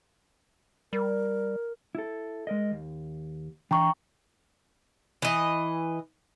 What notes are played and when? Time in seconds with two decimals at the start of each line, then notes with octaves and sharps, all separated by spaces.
0.93 G3 A#4
1.95 E4 A4
2.47 G#3 A#4 D#5
2.71 D#2
3.71 E3 D4 G5 A#5 C#6
5.22 E3 D#5